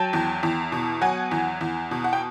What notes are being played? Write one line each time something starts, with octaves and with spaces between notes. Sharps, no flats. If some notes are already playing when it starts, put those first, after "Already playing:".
Already playing: F#3 G5 A5
E2
E2
B2
F#3 F#5 G#5
E2
E2
B2
F#5
G5